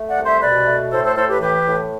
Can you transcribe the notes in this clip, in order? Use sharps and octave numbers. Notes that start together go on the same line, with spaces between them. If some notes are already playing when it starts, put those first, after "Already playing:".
Already playing: A3
D5 F#5
C2
C5 E5
B2 B4 D5
A3
A2 A4 C5
A4 C5
A2 A4 C5
G4 B4
E3 G4 B4
A2